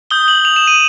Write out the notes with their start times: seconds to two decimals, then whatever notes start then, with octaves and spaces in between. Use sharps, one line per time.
0.11 D#6 G6 G7
0.28 F#7
0.45 F7
0.56 E7
0.67 D#7